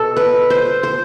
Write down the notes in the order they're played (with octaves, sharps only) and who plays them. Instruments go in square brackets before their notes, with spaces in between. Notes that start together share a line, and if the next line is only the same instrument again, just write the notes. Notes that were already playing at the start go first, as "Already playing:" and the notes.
Already playing: [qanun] B2 A4
B4
C5
C5